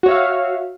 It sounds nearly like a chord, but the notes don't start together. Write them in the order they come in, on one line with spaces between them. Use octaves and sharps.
F#4 C#5 E5 F5